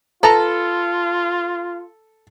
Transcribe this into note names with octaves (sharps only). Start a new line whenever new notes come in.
F4 A4 B4 A5 A#5